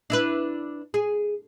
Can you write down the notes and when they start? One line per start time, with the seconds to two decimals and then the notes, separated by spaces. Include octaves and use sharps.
0.10 D4 E4 B4
0.94 G#4